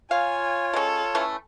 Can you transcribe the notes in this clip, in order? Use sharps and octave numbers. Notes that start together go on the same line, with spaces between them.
F4 C#5 F5 G#5
G#3 C#4 A4
E3 A3 C#4